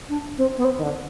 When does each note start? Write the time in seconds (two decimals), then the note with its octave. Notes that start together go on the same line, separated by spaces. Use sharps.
0.09 D4
0.38 C4
0.57 B3
0.65 C4
0.77 D#3
0.83 D3